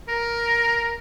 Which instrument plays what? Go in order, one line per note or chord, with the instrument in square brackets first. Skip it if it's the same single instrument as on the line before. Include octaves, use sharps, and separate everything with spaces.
[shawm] A#4